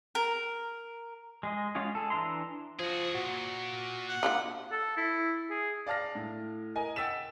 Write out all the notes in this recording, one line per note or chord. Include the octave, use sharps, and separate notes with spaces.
A#4
G#3 G#4 D#5
G#3 C#4 F4 F#4 G#4
G#4 A4
E3 D4 E5 A#5 C6
F3 F#4 G#4
A#2 F#4
F#5
A#3 D4 F4
A4
E4
G#4
D5 F5 A5 F6 A#6
A2
A#4 D#5 G#5
F#5 G5 E6 A6 B6 E7